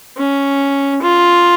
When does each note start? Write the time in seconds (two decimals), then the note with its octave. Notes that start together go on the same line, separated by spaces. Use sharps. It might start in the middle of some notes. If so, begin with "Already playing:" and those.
0.18 C#4
1.02 F4